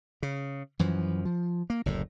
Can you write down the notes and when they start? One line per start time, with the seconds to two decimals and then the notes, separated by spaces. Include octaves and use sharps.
0.23 C#3
0.79 F#2 E3 F3
1.25 F3
1.70 A#3
1.86 F#1 D2 A2